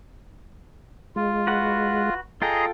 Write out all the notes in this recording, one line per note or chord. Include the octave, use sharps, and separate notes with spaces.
G#3 F4
F#4 B4 F#5
F4 G#4 A4 D#5 G5 A#5 C6